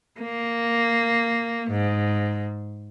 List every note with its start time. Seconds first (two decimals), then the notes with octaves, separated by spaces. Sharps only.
0.20 A#3
1.70 G#2